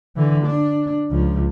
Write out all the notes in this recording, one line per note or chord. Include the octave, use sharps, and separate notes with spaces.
D3 E3
D4
C#2 F3